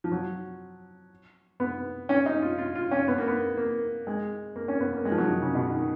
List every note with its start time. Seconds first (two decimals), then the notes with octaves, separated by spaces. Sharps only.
0.04 F3
0.12 F#3
1.60 B3
2.09 C#4
2.26 D#4
2.42 F4
2.58 F4
2.75 F4
2.91 C#4
3.08 B3
3.18 A#3
3.28 B3
3.57 A#3
4.07 G#3
4.56 A#3
4.68 C#4
4.80 B3
4.93 A#3
5.05 G#3
5.12 F3
5.18 F#3
5.25 F3
5.30 D#3
5.42 C#3
5.55 B2
5.71 D#3